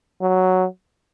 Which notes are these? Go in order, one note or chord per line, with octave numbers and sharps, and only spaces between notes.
F#3